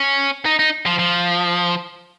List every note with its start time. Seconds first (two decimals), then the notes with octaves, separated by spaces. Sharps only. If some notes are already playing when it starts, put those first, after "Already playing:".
Already playing: C#4
0.46 D#4
0.59 D#4
0.86 F3
0.99 F3